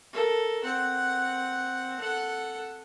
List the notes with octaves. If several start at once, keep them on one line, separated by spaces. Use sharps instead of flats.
A4 A#4
C4 F#5
A4 F#5